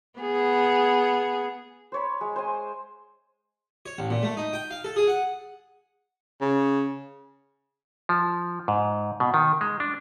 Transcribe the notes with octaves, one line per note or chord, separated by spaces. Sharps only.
B3 G#4
C5 C#5 B5
G#3
C5 G#5
C#5
A1
A#2
A3
D#4
G5
F5
A4
G#4
F#5
C#3
F3
G#2
B2
D#3
G#3
D4